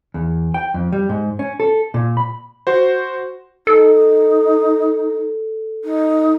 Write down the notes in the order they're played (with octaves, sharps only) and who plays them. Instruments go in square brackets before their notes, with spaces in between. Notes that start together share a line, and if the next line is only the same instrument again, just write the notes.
[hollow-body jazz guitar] E2
G5
F2
G3
G#2
C#4
A4
A#2
B5
[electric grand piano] F#4 C5
[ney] D#4 [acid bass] A4
[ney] D#4